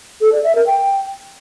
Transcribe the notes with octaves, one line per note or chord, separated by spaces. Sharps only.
A4
D5
E5
A#4
G5